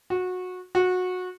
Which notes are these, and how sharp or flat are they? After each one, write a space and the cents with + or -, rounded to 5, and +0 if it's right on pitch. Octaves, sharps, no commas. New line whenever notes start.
F#4 -20
F#4 -20